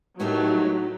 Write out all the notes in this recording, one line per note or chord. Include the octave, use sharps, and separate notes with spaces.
A2 F#3 A3 D#4 G4 A#4